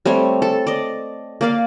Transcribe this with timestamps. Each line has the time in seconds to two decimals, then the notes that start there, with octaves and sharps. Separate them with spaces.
0.05 G3 A3 C4 C#5
0.42 A4
0.67 D5 D#5
1.41 A#3 D5 F5